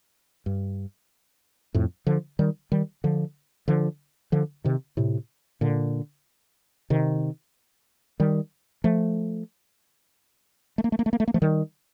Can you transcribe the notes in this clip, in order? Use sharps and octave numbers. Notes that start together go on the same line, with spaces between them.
G2
F2 A2
D3 F3
D#3 G3
D#3 G3
D3 F3
D3 F3
D3 F3
C3 D#3
A2 C3
A#2 D3
C3 D#3
D#3 G3
F3 A3
A3
A#3
A3
A#3
A3
A#3
A3
A#3
F3 A3
D#3 G3